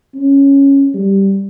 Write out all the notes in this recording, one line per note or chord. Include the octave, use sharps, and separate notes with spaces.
C#4
G3